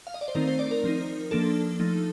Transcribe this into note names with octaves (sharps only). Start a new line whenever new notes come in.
F5
D#5
D5
C5
D#3 A3 C4 D#4 A#4
C5
D5
A#4
F3 C4 D#4
F3 A#3 D4 A4
F3 A3 D#4